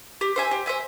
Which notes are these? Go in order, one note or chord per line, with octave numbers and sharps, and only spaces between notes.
G4
C5 E5 G#5
G4
C5 E5 G#5